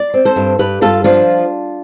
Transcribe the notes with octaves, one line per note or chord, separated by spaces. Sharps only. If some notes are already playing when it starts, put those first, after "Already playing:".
Already playing: D5
C4
A4 C5
G2
G2 G4 B4
G2 F4 A4
F3 D4 F4